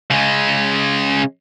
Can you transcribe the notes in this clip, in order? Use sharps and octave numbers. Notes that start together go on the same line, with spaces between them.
C#3 G#3